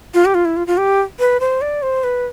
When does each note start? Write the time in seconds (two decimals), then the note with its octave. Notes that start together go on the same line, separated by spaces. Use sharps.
0.14 F4
0.25 G4
0.35 F4
0.45 E4
0.57 F4
0.67 F4
0.78 G4
1.19 B4
1.40 C5
1.61 D5
1.82 C5
2.04 B4